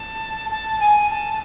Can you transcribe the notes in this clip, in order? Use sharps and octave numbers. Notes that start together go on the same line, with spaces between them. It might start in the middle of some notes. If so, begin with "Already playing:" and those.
Already playing: A5
A5
G#5
A5